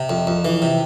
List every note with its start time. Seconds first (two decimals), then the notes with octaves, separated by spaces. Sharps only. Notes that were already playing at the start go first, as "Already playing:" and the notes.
Already playing: C3
0.09 F2
0.27 F2
0.45 E3
0.62 C3